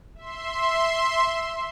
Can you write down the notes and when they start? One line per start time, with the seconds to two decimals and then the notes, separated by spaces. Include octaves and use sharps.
0.15 E5 C6